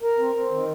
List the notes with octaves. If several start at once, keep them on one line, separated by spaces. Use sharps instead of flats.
A#4
C4
C4
D#3